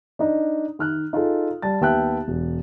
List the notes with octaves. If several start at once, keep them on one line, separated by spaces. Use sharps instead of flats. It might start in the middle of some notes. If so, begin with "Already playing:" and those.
D4 D#4 D#5
D#3 F6 F#6
D#4 F4 G#4 A4
G3 A5 A6
D#2 B3 E5 G5 A5 F#6
E1